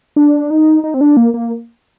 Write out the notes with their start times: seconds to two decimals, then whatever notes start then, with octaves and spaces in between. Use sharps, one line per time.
0.16 D4
0.50 D#4
0.84 D#4
0.94 C4
1.01 D4
1.17 A#3
1.34 A#3